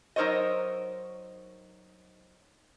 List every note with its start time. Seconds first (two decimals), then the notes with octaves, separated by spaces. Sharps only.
0.16 F#3 D#4 A#4 C5 C#5 D#5